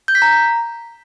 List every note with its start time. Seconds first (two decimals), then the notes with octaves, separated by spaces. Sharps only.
0.08 G6
0.15 B6
0.22 A#5